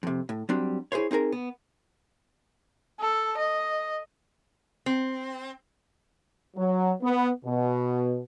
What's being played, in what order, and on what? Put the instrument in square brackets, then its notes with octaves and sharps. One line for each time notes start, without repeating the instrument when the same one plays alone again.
[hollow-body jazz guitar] F2 C3
A2
F#3 G3 C4 D4
E4 G#4 A#4 C5 C#5
C4 D#4 G#4 A#4
B3
[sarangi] A4
D#5
[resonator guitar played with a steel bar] C4
[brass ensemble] F#3
B3
B2